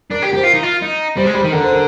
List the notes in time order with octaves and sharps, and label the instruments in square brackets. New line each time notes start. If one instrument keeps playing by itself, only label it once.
[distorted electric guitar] D4 [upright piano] A#4
[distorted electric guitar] G4
[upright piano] A#4
[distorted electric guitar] G4 [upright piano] C5
[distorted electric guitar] F4 [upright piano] A#4
[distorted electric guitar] D#4
F4
D#4
[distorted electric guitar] G3 [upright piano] C5
[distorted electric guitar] G#3
[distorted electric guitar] G3 [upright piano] C5
[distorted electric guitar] D#3
[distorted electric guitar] D3 [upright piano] A#4
[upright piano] C5
A#4